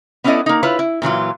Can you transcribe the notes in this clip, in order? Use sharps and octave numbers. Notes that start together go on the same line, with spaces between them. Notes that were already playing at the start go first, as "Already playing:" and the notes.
B3 C#4 D4 E4 A4 D#5
A#3 D#4
E4 F4 B4 C#5
E4
A#2 E3 F#3 F4